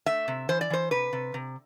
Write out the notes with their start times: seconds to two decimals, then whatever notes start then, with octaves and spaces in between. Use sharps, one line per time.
0.06 A3 E5
0.28 C3
0.49 E3 C5
0.61 D5
0.70 E3 C5
0.91 C3 B4
1.13 C3
1.34 C3